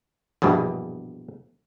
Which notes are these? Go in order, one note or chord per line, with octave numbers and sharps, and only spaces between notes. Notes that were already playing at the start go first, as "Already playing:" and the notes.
A#1 E2 G2 B2